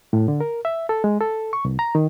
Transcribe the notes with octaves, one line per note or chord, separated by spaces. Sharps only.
A2
D3
A#4
E5
A4
G#3
A4
C#6
C2
A#5
D#3